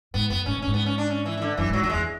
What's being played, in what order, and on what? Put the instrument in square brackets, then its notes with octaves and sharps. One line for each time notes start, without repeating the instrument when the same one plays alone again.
[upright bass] G#2 [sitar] B3
[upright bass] F#2 [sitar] B3
[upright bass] G#2 [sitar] C#4
[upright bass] A2
[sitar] C#4
[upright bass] G#2
[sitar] B3
C#4
D4
C#4
E3
E3
D3
[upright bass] F#2 [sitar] E3
[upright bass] G#2 [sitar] F#3
[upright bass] F#2 [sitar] F#3
[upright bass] E2 [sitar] G#3